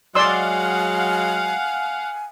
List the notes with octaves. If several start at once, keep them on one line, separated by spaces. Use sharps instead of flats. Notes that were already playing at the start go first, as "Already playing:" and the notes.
F#3 G#3 D5 F5 F#5 G#5 C6 E6